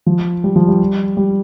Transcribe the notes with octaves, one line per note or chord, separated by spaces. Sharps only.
F3
G3
F3
G3
G3